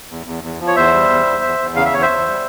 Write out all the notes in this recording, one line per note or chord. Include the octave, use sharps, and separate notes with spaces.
E2
E2
E2
F3
C#5
E2 C5 E5
G3
E2
E2
E2
E2
C#3 F5
E5
E2 C#5
C5 E5
E2
G3